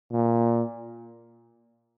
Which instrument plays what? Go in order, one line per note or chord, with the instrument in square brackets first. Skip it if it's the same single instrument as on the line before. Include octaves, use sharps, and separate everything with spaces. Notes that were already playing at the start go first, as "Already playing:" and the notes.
[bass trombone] A#2